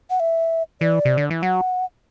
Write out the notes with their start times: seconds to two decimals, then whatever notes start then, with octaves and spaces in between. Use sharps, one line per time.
0.10 F#5
0.20 E5
0.81 E3 D5
1.05 C3
1.17 D3
1.30 E3
1.42 F#3 F#5